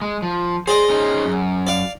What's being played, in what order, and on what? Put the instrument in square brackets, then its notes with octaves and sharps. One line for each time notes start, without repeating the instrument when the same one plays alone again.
[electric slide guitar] G#3
F3
[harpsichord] G#4 D5 D#5 [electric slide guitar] C5
[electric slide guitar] C#4 D#4 C5
F#2
[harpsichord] D5 F5